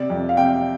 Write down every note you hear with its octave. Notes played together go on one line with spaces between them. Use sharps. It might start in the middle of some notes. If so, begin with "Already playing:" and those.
Already playing: C3 D5
F2
F5
C3 G5